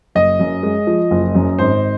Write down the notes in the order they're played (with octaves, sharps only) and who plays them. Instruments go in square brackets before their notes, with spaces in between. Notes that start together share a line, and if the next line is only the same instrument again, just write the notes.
[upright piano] F#1 [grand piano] D#5
[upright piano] F#2
G#3
F3
F#1
F#2
[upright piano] G#1 [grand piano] C5